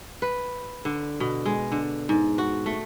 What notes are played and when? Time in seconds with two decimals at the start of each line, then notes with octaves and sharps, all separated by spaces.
0.22 B4
0.85 D3
1.20 B2
1.45 G#3
1.72 D3
2.09 G#2
2.38 F#4
2.66 A3